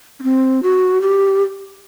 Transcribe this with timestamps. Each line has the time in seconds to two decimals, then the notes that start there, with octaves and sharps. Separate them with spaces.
0.20 C#4
0.23 C4
0.63 F#4
1.01 G4